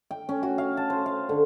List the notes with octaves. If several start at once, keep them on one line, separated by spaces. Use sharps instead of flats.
G5
C#4
F#4
F5
A5
C5
F5
D3